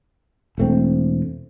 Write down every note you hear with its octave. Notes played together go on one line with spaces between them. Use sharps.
E1 A3 C4